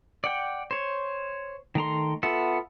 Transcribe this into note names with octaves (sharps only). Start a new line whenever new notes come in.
D5 F#5 G5
C5 C#5
D#3 A3 A#5 C6
B3 F4 A4 E5 F#5